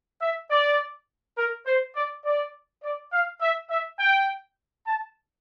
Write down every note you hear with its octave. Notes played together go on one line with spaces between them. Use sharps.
E5
D5
A#4
C5
D5
D5
D5
F5
E5
E5
G5
A5